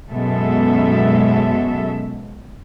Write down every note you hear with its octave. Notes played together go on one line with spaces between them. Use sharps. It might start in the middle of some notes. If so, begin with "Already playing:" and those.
F#2 B2 G#3 A4 E5